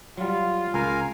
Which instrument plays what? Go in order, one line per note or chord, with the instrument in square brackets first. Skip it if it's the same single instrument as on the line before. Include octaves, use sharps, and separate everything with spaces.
[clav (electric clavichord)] F#3 G3 [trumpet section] F4
[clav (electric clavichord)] C#2 [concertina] A#4 F5 G#5